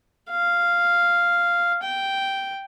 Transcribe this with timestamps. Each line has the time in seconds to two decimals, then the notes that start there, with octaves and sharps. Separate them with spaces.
0.30 F5
1.83 G5